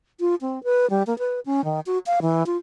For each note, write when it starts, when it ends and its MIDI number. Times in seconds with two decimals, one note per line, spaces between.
0.20 0.35 65
0.41 0.63 60
0.64 0.89 71
0.90 1.03 55
1.07 1.17 58
1.19 1.40 71
1.46 1.64 61
1.65 1.80 51
1.86 1.98 66
2.06 2.20 77
2.22 2.46 52
2.46 2.57 65